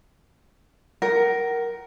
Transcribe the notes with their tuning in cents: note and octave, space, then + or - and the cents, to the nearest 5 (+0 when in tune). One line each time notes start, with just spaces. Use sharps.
A#4 +5 F#5 +35